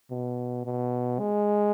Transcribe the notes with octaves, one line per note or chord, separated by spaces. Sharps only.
B2
B2
G#3